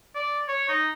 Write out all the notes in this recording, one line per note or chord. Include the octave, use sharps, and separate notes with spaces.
D5
C#5
D#4